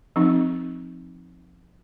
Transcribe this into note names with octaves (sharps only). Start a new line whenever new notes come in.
F3 C4 D#4